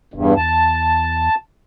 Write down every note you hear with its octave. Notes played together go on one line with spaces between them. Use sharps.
E1 E2 G2
E2 A5